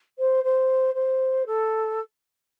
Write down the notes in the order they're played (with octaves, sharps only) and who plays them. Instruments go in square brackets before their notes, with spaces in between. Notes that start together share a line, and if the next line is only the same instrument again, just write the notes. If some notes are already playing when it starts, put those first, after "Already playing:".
[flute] C5
C5
C5
A4